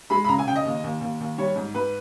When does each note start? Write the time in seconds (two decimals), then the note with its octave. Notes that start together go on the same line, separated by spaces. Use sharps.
0.10 G#3 B5
0.24 B5
0.28 C#3 A#5
0.39 G#5
0.47 C#3 G5
0.56 D#5
0.65 D#2
0.84 D#2
1.01 D#2
1.20 D#2
1.38 G3 C#5
1.56 G#2
1.74 G#2 B4